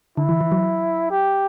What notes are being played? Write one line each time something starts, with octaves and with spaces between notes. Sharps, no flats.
D3 E4
E3
E3
F#3
G4